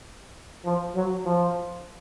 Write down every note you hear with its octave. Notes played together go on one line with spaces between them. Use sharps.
F3
F#3
F3